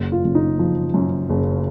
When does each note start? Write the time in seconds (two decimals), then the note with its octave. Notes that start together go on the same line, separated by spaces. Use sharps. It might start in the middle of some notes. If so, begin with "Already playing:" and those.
Already playing: F#1
0.12 F4
0.24 F#1
0.35 D#4
0.59 F3
0.94 F#2
1.29 F#1